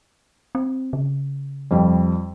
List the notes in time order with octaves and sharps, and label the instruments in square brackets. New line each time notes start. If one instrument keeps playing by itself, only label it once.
[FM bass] C4
C#3
[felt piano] F2 G3